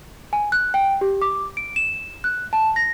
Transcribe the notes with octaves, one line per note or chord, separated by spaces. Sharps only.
G#5
F#6
G5
G4
D6
D7
E7
F#6
A5
A#6